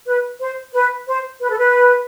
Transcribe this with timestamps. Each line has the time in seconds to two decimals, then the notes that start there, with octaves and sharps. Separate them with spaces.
0.06 B4
0.40 C5
0.74 B4
1.08 C5
1.41 B4
1.50 A4
1.58 B4